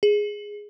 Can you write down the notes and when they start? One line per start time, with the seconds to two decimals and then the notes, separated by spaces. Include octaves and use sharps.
0.03 G#4